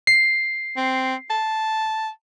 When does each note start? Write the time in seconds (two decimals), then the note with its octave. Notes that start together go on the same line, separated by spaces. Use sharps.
0.07 C7
0.77 C4
1.30 A5